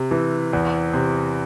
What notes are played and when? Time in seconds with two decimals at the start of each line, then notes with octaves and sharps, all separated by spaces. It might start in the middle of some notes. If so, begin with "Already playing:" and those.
Already playing: C3
0.11 E3
0.53 E2
0.93 C3